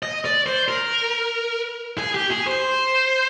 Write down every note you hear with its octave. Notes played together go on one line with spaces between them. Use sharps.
D#5
D5
C5
A#4
G#4
G4
G#4
C5